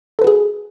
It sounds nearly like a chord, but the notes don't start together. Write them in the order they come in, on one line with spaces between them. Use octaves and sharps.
A4 B4 F#4 G#4